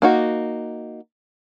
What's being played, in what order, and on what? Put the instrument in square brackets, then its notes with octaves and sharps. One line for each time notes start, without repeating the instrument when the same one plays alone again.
[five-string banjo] A#3 D#4 F#4